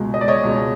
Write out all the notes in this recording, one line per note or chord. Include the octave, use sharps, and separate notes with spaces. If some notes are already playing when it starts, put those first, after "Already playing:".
Already playing: C#2 B2 G#3
D#5
D5
C#5 D#5
C#2 B2 G#3